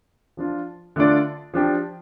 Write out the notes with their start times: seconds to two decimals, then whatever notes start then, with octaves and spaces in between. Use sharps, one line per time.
0.37 F3 D4 F4
0.96 D3 A3 D4 F4 D5
1.54 F3 D4 G4